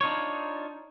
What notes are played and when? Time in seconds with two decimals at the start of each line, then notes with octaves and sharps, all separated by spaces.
0.01 D4 D#4 F4 C#5